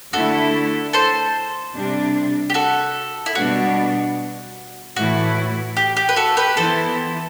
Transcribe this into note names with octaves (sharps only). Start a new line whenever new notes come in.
D3 A3 E4 F#4 A4
A4 C5
C3 G3 D4
G4
F#4 A4
E4
B2 G3 B3 D4 F#4
A2 E3 A3 E4 F#4
G4
G4
B4
F#4 A4
G4 B4
E3 B3 E4 A4 C5